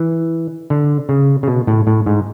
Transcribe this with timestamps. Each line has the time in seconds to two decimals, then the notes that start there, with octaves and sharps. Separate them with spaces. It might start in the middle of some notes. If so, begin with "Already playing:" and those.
Already playing: E3
0.70 D3
1.09 C#3
1.43 C#3
1.48 B2
1.67 A2
1.87 A2
2.06 G#2